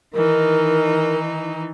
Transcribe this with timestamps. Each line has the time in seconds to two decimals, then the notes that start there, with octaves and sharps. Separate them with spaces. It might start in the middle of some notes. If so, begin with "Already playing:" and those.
0.14 D#3 E3 D#4 A#4